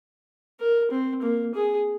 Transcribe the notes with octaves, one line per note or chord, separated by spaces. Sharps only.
A#4
C4
A#3
G#4